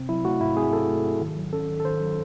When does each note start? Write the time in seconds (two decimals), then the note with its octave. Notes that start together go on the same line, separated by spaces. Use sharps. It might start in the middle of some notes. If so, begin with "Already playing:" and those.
Already playing: C3 C4
0.09 F#3 E4
0.25 A3 F#4
0.41 G#2 E4
0.57 C4 G#4
0.73 F#3 A4
0.89 A3
1.05 G#2
1.21 D#3
1.36 F#3
1.53 C#4 A4
1.69 D#3
1.80 A4
1.85 D#3 C5
2.01 F#3